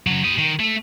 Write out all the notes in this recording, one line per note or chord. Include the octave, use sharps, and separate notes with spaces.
C#3 F#3
G4 D#5
D#3
A3